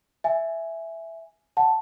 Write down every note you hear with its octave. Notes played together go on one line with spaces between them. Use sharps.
E5 G#5
F#5 A5